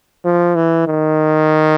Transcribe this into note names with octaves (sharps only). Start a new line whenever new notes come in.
F3
E3
D#3